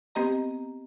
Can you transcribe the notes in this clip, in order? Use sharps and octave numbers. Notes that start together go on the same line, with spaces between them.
B3 C4 G4 D#5 A#5